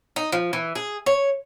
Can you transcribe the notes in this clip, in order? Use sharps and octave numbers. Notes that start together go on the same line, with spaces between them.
D#4
F3
E3
G#4
C#5